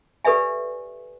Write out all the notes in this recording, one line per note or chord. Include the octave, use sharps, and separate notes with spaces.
G4 A4 B4 D5 E5 G#5